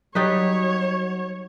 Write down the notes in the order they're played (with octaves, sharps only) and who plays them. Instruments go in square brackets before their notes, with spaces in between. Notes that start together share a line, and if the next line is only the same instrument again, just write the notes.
[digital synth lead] F#3 [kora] G3 D#4 B4 [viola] C#5